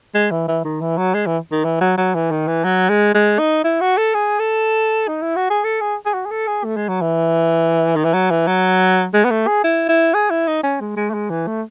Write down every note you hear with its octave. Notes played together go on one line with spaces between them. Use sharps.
G#3
E3
E3
D#3
E3
F#3
G#3
E3
D#3
E3
F#3
F#3
E3
D#3
E3
F#3
G#3
G#3
D#4
E4
F#4
A4
G#4
A4
D#4
E4
F#4
G#4
A4
G#4
G#4
F#4
G#4
A4
G#4
A3
G#3
F#3
E3
D#3
E3
F#3
E3
F#3
G#3
B3
A3
G#4
E4
E4
G#4
E4
D#4
C#4
G#3
G#3
A3
G#3
E3
A3